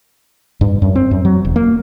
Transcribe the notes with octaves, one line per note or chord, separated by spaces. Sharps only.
G2
F#2
C4
F#2
F#3
E1
A#3